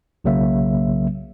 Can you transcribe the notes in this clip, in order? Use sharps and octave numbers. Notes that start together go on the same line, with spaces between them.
B1 C#3 F#3 A#3 E5